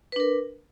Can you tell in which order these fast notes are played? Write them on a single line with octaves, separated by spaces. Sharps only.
B4 D4 A#4